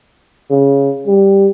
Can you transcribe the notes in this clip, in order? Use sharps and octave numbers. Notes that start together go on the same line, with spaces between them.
C#3
G3